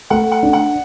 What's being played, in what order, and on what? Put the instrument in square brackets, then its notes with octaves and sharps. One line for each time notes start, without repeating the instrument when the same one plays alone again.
[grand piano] A3 [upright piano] F#5
[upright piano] F#5
[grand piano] D4
[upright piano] F#5